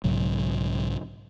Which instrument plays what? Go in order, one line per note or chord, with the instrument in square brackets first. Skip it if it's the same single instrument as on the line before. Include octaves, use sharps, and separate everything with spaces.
[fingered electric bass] B1 G#2 C#3 F#3